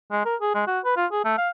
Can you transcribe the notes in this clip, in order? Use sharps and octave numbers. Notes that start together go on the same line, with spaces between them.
G#3
A#4
G#4
G#3
F#4
B4
F4
G#4
A3
F5